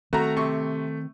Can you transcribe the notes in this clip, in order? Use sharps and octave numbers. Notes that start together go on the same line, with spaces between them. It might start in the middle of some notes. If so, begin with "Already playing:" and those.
D#3 A3 C4 F#4 A#5
C3 C#6